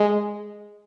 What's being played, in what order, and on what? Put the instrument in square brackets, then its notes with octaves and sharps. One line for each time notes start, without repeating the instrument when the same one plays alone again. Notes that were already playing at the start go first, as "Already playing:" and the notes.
Already playing: [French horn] G#3